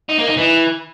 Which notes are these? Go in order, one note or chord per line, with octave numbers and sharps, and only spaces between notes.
D#4
A#3
D#4
E3